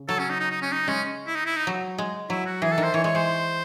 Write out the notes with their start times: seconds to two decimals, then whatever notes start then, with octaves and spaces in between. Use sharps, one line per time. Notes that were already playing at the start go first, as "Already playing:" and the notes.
Already playing: C#3
0.08 F#3 A4
0.19 C#4
0.29 D#4
0.40 D#4
0.50 D#4
0.61 C#4
0.72 D#4
0.88 G#3 C#4
1.26 E4
1.35 D#4
1.46 E4
1.57 D#4
1.67 F#3
1.98 G#3
2.30 F#3 E4
2.46 F#4
2.62 E3 G#4
2.72 A4
2.78 D#3
2.83 C5
2.94 E3 C#5
3.04 G#3 C#5
3.15 G#3 C5